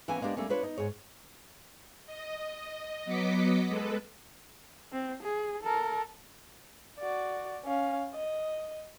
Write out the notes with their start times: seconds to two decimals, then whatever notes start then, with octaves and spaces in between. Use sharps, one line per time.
0.08 E3 A#3 B3 C#4 G#5
0.21 G#3 A#3 B3 D4 G4
0.37 G3 A3 A#3 C#4
0.49 D4 F4 B4 C#5
0.63 D#4
0.78 G#2 G#4 C#5
2.06 D#5
3.05 F#3 B3 D#5 D6 B6 C#7
3.68 G#3 A4 B4
4.93 C4
5.23 G#4
5.63 A4 A#4
6.99 F#4 D5
7.65 C#4 F5
8.14 D#5